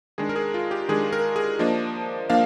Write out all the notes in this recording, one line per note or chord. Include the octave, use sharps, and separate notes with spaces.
D#3 G#3 D4 G#4
A#4
G#4
F4
G4
D#3 G#3 D4 G#4
A#4
G#4
F3 A#3 D4 D#5
F3 A#3 D4 F5